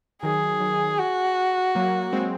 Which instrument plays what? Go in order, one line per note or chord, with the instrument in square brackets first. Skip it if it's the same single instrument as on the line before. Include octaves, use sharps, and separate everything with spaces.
[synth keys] D#3 F#3 [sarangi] G#4
[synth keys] D#3 F#3
[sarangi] F#4
[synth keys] F#3 A#3
G#3 C4